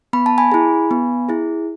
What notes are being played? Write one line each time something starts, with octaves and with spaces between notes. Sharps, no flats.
B3 B5
A5
G#5 B5
E4 G#4
B3
E4 G#4